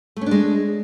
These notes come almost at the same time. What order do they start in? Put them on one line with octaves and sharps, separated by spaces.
A3 C#4 D4 G#3